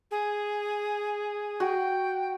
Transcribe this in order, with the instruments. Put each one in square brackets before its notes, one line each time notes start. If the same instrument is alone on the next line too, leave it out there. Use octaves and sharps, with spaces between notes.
[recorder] G#4
[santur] F#4 [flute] G5